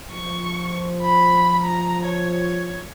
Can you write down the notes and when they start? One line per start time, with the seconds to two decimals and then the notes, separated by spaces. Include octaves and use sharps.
0.11 F3 C#6
1.02 B5
1.64 A#5
2.05 C#5